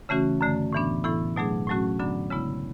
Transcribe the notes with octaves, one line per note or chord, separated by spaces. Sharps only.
C#3 E3 A3 C#4 F#4
F#2 D3 A3
A2 E3 B3 D4
A2 E3 B3 E4 A4
B2 F#3 A3 D4 G#4
A2 F#3 A3 C#4 F#4
F#2 D3 F#3 B3 D4
C#3 G#3 B3 E4